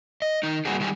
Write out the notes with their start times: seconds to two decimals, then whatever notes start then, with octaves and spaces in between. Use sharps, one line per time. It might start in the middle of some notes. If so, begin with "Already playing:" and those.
0.22 D#5
0.43 D#3 D#4
0.65 G3 A#3 C4 F#4 G#4
0.80 D#3 G3 G4 G#4